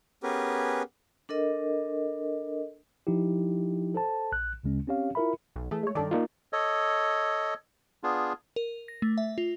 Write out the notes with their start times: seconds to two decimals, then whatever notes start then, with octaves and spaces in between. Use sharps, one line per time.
0.23 B3 C#4 G4 G#4 A#4 B4
1.29 D4 A4 A#4 D#5
3.07 F3 D#4 E4 G4
3.95 A4 C5 A5
4.32 A#1 F#6
4.64 D2 C#3 G#3 C#4
4.87 C4 C#4 G4 C#5 F5
5.15 E4 F4 A#4 E5 B5
5.56 B1
5.71 E3 A3 G#4
5.83 G#3 C#5
5.95 G2 D#3 A4 D5
6.11 A#3 D#4 F4
6.53 A4 C#5 D#5
8.03 B3 D4 F4 G#4
8.56 A#4
8.88 A#6
9.02 A3
9.18 E5
9.38 F4